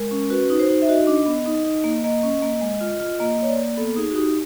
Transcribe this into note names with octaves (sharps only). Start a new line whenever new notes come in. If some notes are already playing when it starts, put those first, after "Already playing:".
Already playing: G#3 A#4
C#4
F#4 B4
D#4
C5
D#4
E5
F#4 D#5
D4
B3
D#4
D#4
A#3
A#3 D#5
C#4
A#3
G#3
F4
F4
A#3 D#5
A#3 C#5
D5
A#3
B3 A4
D#4 G#4
F#4
D#4 G4